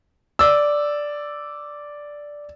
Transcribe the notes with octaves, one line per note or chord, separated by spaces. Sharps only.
D5 E6